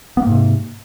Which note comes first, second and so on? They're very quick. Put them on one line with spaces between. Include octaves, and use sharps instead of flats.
B3 A#3 G#2 C3